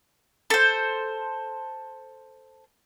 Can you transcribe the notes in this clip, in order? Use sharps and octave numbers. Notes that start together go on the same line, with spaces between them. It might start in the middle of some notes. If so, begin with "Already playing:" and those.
A4 C5